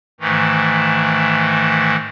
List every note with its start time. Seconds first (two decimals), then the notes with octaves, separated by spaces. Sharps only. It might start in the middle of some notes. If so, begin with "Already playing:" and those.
0.20 G#2 D#3 E3 A3